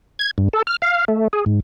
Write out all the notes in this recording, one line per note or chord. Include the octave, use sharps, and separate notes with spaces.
G#6
G2
A4
F6
F5
A3
G#4
G#2